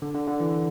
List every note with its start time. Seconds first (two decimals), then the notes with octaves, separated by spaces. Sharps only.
0.02 D3
0.14 D3
0.27 D3
0.40 E3